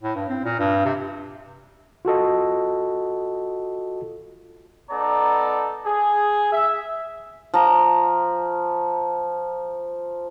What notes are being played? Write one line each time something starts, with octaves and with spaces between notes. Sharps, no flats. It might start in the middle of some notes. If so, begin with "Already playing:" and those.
A2
G2
C4
A#2
G2
C3
F4 F#4 A4 D#5
B3 D#4 A4 D5 A#5
G#4
E5
F3 A#5